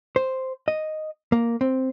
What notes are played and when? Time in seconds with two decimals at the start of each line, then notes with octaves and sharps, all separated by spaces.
0.16 C5
0.68 D#5
1.32 A#3
1.61 C4